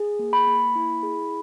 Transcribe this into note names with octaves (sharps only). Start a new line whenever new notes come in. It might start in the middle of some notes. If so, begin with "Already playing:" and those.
Already playing: G#4
A#3
B5
A#3
E4
G#4